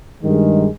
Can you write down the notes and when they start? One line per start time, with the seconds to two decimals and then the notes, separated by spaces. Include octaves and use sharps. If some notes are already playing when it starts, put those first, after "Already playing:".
0.23 G2 D#3 G#3